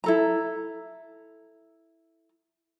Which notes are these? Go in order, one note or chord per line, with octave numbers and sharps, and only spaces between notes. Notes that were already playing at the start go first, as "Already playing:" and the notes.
E4 A4 A#5